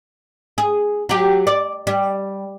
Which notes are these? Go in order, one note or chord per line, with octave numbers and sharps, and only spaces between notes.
G#4
F#3 G4
D5
G3